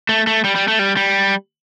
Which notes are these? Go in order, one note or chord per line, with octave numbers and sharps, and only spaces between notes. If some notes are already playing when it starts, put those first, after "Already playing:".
A3
A3
G3
G3
A3
G3
G3